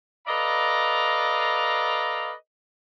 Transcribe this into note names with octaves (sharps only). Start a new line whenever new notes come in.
A4 B4 D5 D#5 F5 A#5